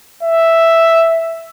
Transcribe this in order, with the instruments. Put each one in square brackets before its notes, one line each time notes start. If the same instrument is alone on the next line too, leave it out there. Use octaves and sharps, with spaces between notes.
[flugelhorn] E5